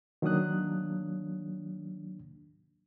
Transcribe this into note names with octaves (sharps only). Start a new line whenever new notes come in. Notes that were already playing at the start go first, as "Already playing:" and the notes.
D#3 F#3 A#3 D4 D#6 F#6